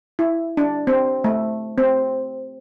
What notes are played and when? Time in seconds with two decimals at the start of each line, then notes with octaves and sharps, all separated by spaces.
0.19 E4
0.57 D4
0.87 C4
1.24 A3
1.78 C4